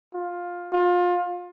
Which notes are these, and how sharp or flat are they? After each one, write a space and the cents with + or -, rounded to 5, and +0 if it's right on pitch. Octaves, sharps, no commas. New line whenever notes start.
F4 +10
F4 +25